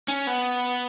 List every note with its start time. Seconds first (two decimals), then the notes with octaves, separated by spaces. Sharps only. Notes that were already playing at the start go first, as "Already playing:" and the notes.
0.08 C#4
0.27 B3